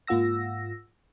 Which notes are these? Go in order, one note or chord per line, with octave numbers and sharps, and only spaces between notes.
G#2 A#3 F4 F#5 E6 A#6